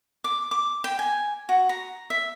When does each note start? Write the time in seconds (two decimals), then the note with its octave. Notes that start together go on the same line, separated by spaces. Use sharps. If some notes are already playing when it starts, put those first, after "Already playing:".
0.24 D6
0.51 D6
0.84 G5
0.99 G#5
1.49 F#4
1.69 A#5
2.10 E5